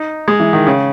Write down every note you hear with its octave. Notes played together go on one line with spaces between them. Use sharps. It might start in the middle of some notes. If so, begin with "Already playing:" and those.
Already playing: D#4
G#3
E3
D#3
C#3